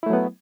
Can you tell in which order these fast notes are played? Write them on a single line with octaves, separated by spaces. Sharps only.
E4 A3 F#3 B3